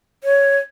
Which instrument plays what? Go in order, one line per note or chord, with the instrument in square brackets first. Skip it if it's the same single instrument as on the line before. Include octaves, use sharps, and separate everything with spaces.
[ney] C#5